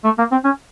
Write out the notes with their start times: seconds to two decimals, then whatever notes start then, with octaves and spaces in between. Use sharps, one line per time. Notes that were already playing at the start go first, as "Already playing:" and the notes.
0.05 A3
0.18 A#3
0.32 C4
0.44 C#4